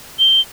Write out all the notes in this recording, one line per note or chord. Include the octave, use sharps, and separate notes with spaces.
G7